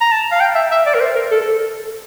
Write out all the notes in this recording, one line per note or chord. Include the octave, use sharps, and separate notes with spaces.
A#5
A5
F5
G5
E5
E5
D5
A#4
C5
A#4
A4
A4